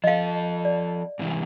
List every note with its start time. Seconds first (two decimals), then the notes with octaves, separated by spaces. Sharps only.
0.04 F3 A4 D#5 F5
0.65 D5
1.19 G#2 C3 E3